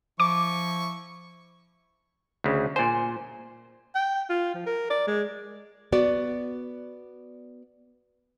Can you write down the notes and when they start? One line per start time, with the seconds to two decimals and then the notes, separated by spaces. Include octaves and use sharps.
0.20 F3 E4 C#6 D6
2.44 D2 C#3
2.76 A#2 C5 G#5
3.95 G5
4.29 F4
4.54 F3
4.66 A#4
4.90 D5
5.07 G#3
5.92 B3 F#4 D5